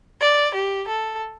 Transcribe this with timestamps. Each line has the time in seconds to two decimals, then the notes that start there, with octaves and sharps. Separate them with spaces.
0.21 D5
0.54 G4
0.88 A4